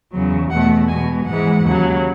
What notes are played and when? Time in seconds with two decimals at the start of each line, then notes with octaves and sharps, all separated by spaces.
0.12 E2 C#3 F#3
0.50 E2 B2 A3 F#5
0.88 B2 G#3 G#5
1.26 G#2 E3 G#3 F#5
1.64 D#2 C#3 F#3